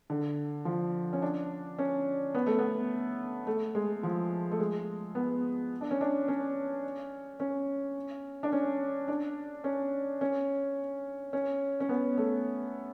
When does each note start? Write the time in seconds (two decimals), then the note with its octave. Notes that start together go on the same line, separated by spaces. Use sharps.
0.10 D3
0.65 F3
1.13 C#4
1.22 D4
1.79 C#4
2.34 B3
2.46 A3
2.59 B3
3.47 A3
3.75 G#3
4.03 F3
4.51 A3
4.60 G#3
5.15 B3
5.81 D4
5.91 C#4
6.01 D4
6.28 C#4
7.40 C#4
8.43 D4
8.52 C#4
9.08 D4
9.64 C#4
10.21 C#4
11.33 C#4
11.80 C#4
11.89 B3
12.17 A3